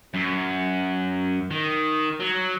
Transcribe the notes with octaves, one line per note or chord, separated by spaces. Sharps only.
F#2
D#3
F#3